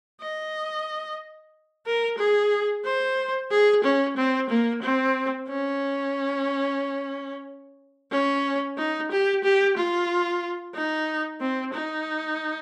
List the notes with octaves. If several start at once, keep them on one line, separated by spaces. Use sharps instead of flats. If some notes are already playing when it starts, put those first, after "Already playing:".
D#5
A#4
G#4
C5
G#4
C#4
C4
A#3
C4
C#4
C#4
D#4
G4
G4
F4
D#4
C4
D#4